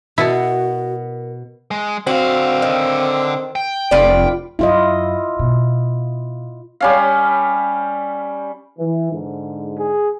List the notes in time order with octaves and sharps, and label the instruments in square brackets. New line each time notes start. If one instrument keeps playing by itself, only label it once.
[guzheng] B2 B3 [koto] E4 A5 [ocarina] F#4 [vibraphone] A#4
[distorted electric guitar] G#3
[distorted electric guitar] D3 F5 [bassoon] C4 [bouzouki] F#4
[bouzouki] D#3
[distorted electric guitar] G5
[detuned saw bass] F1 [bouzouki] F4 B4 D5
[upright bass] F#2 [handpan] E4 F4 D#5
[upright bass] B2
[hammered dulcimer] G3 C#4 F5
[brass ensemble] E3
G#2 D3
[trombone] G#4